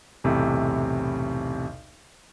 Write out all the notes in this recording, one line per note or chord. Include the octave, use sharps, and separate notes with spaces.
B1 E2 A2 C3